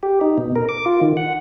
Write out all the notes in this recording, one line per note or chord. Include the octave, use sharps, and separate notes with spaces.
G4
D#4
B2
A#4
D6
F4
D#3
F#5